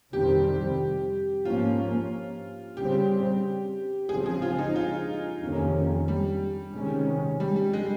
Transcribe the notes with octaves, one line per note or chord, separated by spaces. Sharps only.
F2 C3 D#3 G3 C4 G4
G#2 F3 A#3 C#4 F4
C#3 G3 C4 G4
C#3 F3 C4 G#4
G#4
F4
D#4
F4
F2 C3 D#3 A#3 C#4
G3
C3 D#3 G#3 C#4
G3
G3
G#3